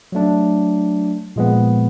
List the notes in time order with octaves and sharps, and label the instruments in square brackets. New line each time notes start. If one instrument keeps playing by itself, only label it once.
[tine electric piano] F#3 A3 D4
A#2 F3 G#3 B3